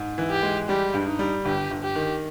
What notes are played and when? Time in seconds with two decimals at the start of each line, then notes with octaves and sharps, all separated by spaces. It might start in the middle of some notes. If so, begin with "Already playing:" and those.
Already playing: G#2
0.18 E3
0.31 G4
0.43 G#3
0.68 G3 G4
0.94 G2
1.06 D#4
1.19 G3
1.44 G1 G4
1.71 G1
1.83 G4
1.95 D#3